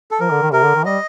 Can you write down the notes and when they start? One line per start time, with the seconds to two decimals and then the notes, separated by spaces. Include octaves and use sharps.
0.11 A4
0.20 F3 A#4
0.30 D3
0.42 D#3
0.52 C3 A#4
0.63 D3
0.75 D#3
0.85 G3 D#5